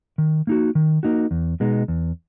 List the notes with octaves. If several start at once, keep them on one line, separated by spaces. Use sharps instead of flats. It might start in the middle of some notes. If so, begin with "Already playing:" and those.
D#3
A#3 D#4 F#4
D#3
A#3 D#4 F#4
E2
B2 G#3 B3 D#4
E2